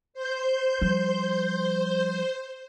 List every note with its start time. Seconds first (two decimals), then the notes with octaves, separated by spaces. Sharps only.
0.14 C5 G6
0.81 F3 G3